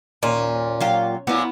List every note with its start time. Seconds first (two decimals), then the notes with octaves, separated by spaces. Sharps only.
0.23 D#2 A#2 C#4
0.80 F#3 F4 G4
1.27 A#2 F#3 B3 E4